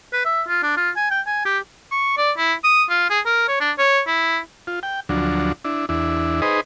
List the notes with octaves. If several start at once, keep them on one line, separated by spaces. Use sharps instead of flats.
B4
E5
F4
D4
F4
G#5
G5
G#5
G4
C#6
D5
E4
D#6
F4
G#4
A#4
C#5
D4
C#5
E4
F4
G5
D2 F3 F#3 D4
D4 E4
E2 D4 E4
D#4 G#4 B4 C5 D#5